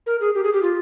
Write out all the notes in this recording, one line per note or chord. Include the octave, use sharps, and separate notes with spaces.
A#4
G#4
G4
G#4
G4
F4